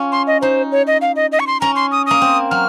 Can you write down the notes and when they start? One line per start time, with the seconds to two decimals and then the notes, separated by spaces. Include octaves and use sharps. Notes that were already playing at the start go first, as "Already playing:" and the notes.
Already playing: C#4 F4
0.12 C6
0.27 D#5
0.42 D#4 C5
0.72 C#5
0.87 D#5
1.01 F5
1.16 D#5
1.32 D#5
1.40 C#6
1.47 C6
1.61 C#4 A#5
1.76 C6
1.92 D#6
2.06 A#3 D#6
2.21 C4
2.51 F#3 F6